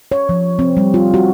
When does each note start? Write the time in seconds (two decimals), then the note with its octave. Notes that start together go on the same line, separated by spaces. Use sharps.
0.12 C#5
0.29 F3
0.59 C4
0.77 G3
0.94 F4
1.14 F#4